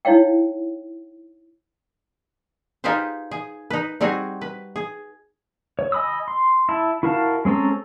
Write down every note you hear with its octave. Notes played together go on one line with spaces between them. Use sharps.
D#4 E4 C#5 F5 G5
D#4 F4 G4 G#4 B4 C5
G#4
D#4 B4
G3 C4 D#4 F#4 G#4
B4
G#4
C#5
D#5 G#5 B5 D#6 E6
C6
E4 A5
E4 F#4 A#4 F5 A5
G#3 C4 C#4 A4 A#5